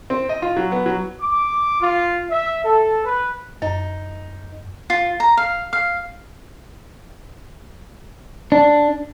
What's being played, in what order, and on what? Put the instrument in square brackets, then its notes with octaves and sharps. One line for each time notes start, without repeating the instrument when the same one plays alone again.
[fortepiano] C4
D#5
F4
F#3
B3
F#3
[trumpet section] D6
F4
E5
A4
B4
[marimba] F#2 [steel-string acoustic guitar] D#4
[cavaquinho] F4
A#5
F5
F5
[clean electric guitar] D4